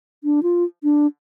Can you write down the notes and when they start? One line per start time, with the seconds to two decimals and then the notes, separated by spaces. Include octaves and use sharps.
0.24 D4
0.43 F4
0.83 D4